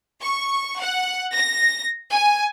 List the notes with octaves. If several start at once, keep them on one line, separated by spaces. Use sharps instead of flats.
C#6
F#5
A#6
G#5